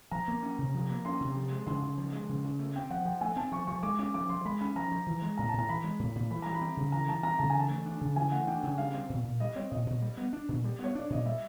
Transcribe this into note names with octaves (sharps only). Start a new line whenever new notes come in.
F3 A#5
A#3
C#4
C3
F3
A#3
C#4 C6
C3
F3
G#3
C#3 C6
C#3
F3
G#3
C#3
C#3
A3
C4 G5
F3 F#5
F3 G5
A3 G#5
C4 A5
F3 C#6
F3 C#6
G#3 D6
C#4 D6
F3 D6
F3 C6
G#3 B5
C#4 B5
F3 A#5
F3
E3
G#3
A2 A#5
A2 A5
A#5
E3 B5
G#3
A2
A2
E3 B5
G3 A#5
B5
C4
C#3
E3 A#5
G3 A5
C4 A#5
C#3 A5
E3 G#5
A5
A3
D4
C#3
E3 G#5
A3 F#5
D4 G5
C#3
G3 F5
C4
A#2
A#2
G3 D#5
C4 C#5
A#2 D#5
A#2
G3
B3
D4
A#2
G3
B3 C#5
D4 D5
A#2 D#5
G3 E5